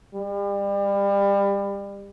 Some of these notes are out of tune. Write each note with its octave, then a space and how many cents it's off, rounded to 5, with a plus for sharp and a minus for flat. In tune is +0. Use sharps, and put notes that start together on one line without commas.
G3 +30